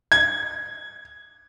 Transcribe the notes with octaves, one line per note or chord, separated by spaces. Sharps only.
G#6